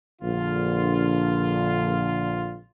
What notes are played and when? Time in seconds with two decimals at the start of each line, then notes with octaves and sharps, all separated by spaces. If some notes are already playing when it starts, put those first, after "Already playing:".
0.22 A#1 D3 F4